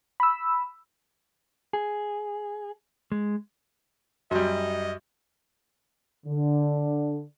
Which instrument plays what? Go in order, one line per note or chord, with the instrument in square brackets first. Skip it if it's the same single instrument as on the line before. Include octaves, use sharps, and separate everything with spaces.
[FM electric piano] B5 E6
[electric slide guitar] G#4
G#3
[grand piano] F#2 G3 [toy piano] F#4 [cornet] D#5
[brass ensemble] D3